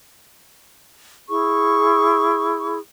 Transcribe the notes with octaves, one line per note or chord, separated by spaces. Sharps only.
E4 G#4 C#6